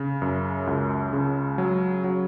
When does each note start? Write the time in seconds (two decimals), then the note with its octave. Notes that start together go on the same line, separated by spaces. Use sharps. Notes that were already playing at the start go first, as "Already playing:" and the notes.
Already playing: C#3
0.22 F#2
0.67 C#2
1.13 C#3
1.58 F#3
2.04 F#3